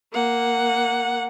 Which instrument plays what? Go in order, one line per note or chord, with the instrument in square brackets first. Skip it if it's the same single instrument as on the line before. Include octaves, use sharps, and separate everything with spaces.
[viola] A#3 F#5